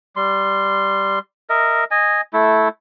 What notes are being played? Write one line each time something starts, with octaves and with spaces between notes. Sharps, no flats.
G3 C6
A#4 D#5 E5
D#5 G#5
A3 E4